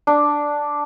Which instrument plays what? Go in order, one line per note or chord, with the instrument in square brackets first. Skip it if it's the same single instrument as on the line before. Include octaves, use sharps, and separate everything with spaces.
[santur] D4